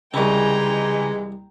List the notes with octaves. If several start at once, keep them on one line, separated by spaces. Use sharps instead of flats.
C2 C#3 E3 G#3 C4 G5 A#5